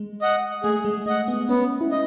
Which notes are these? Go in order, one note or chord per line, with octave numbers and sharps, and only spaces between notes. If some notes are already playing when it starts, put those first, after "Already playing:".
Already playing: G#3
D#5 F#5
A3 G#4
G#3
A3 D#5 F#5
B3
B3 C#4
E4
D#5